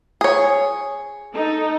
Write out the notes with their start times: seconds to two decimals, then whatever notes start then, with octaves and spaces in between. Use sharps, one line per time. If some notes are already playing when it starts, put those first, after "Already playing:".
0.21 G#4 C#5
1.34 D#4 A4